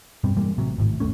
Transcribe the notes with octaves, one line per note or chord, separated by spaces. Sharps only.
G2 B2 G3 C4
E3 G3 G#3 A#3
A1 C3 F#3
G#1 A2
G#1 D#2 A3 C#4